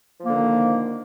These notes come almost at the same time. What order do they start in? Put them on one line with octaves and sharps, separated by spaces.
F3 A#3 D3 D#3